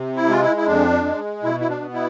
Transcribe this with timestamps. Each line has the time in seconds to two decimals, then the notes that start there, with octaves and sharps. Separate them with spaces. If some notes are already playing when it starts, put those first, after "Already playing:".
Already playing: C3
0.16 E4
0.29 G#3 F4
0.42 E4
0.56 E4
0.67 F2 D4
1.05 G#3
1.43 B2 E4
1.60 E4
1.69 D4
1.81 B3
1.94 E4